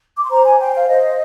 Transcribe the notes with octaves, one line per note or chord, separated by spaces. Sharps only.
D6
C6
C5 A#5
G#5
C5 G5
F5
C5 D#5